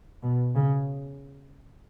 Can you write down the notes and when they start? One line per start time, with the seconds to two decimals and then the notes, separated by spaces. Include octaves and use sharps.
0.23 B2
0.56 C#3